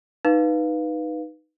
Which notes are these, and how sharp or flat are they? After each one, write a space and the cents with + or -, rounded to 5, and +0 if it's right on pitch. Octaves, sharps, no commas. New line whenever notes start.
D#4 +0 B4 +0 F5 +0